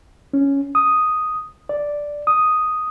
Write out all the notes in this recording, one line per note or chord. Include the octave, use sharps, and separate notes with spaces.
C#4
D#6
D5
D#6